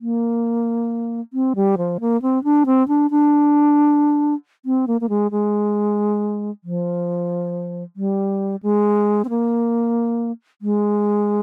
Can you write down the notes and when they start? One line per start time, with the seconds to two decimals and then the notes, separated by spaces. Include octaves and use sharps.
0.01 A#3
1.33 C4
1.56 G3
1.78 F3
2.00 A#3
2.22 C4
2.44 D4
2.66 C4
2.88 D4
3.11 D4
4.65 C4
4.87 A#3
5.01 A#3
5.09 G#3
5.31 G#3
6.64 F3
7.96 G3
8.63 G#3
9.25 C4
9.29 A#3
10.62 G#3